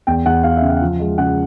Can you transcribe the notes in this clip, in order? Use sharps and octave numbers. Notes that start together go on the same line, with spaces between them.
E2 G5
E2 F#5
E2 F5
E5
C#3
F5
F3
G#3
C#3 F#5